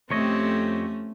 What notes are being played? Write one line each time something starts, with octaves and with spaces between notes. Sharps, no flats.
F2 A3 C4 C#4 G4 C#5 D#5